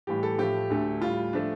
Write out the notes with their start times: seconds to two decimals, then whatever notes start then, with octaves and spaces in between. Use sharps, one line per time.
0.07 A2 E3 G3 G4
0.23 A4
0.38 A2 F3 A3 G4
0.70 D2 D3 A3
1.01 A2 G3 F4
1.33 F3 A3 D4